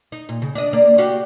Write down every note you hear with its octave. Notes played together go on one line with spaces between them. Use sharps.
D#4
A#2
C#3
D4 D#5
A#3 D5
F#4 G4 F5